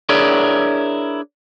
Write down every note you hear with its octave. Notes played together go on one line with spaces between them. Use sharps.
D4 E4 G#4 A#4 C#5 D5